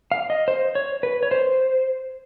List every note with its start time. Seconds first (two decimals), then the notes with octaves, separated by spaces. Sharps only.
0.12 F5
0.30 D#5
0.48 C5
0.75 C#5
1.03 B4
1.23 C#5
1.31 C5